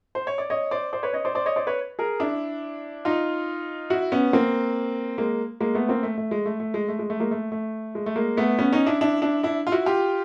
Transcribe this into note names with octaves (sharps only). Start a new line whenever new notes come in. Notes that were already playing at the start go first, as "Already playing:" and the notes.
C5
C#5
D5
C#5 D#5
C5 D5
C5 D5
B4 C#5
C#5 D#5
C5 D5
C5 D5
C#5 D#5
C5 D5
B4 C#5
G#4 A#4
D4 E4
D#4 F4
E4 F#4
B3 C#4
A#3 C4
G#3 A#3
G#3 A#3
A3 B3
A#3 C4
A3
A3
G#3
A3
A3
G#3
A3
G#3
A3
G#3 A#3
A3
A3
G#3
A3
G#3 A#3
A3 B3
B3 C#4
C#4 D#4
D4 E4
D4 E4
D4 E4
D4 E4
F4
E4 F#4
F4 G4